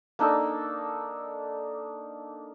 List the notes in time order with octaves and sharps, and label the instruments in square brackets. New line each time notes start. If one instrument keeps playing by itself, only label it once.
[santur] A#3 D4 D#4 A4